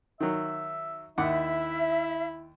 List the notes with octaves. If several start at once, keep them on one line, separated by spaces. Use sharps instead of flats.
D#3 F#3 E5
D#2 E4 E5 F#5 D6